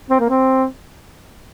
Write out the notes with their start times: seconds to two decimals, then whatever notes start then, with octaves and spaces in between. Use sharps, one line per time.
0.10 C4
0.20 A#3
0.30 C4